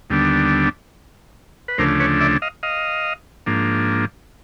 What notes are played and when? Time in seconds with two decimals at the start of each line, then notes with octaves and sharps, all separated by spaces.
0.10 D#2 D3 G3 B3 D4
1.68 B4
1.78 D2 C#3 F3 A3 D4 A#4 C5
2.00 B4 C#5
2.20 D5 E5
2.42 D#5 F5
2.63 D#5 F5
3.46 G#2 F3 A#3 D4